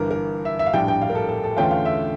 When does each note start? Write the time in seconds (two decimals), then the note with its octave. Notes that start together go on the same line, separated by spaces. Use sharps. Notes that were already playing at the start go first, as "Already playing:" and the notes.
Already playing: G1 G2 E3 A#4
0.11 A#4
0.45 E5
0.59 E5
0.66 F5
0.73 A#1 A2 G3 D4 G5
0.88 G5
1.02 F5
1.10 A#4
1.15 A4
1.29 A4
1.44 A4
1.57 E2 D3 A3 C#4 F4 G5
1.71 F5
1.85 E5